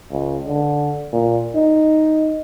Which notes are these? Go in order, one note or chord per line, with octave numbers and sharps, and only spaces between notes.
C#2
D3
A#2
D#4